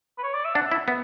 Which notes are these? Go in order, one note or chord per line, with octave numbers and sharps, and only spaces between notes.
B4
C#5
D5
E5
D4 F#5
E4 E5
B3